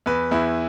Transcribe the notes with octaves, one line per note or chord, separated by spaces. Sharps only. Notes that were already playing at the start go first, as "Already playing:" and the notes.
E2 B4
E2 E4